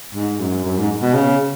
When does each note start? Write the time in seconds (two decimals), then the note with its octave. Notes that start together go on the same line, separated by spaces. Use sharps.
0.15 G#2
0.40 F#2
0.64 F#2
0.77 G#2
1.02 B2
1.14 C#3